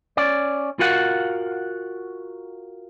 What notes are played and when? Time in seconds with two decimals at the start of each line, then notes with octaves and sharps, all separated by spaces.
0.17 C#4 D5
0.79 F4 F#4 A#4 F5 F#5